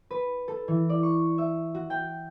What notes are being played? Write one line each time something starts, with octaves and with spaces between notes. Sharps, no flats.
B4
A4
E3
D5
C#6
E5
F#4
G5